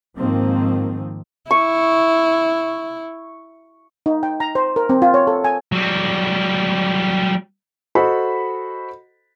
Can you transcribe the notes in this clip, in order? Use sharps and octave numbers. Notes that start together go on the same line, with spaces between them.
G#2 D#3 F3 A#3 C4
E4 C#6
D#4
G5
A#5
C5
A#4
C4
F4
C#5
A4
G#5
F#3 G3
F#4 A4 C5 D#5 B5